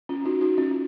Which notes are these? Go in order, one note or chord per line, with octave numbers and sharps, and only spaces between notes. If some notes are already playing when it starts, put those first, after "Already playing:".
C#4 F4
D#4 F#4
D#4 F#4
C#4 F4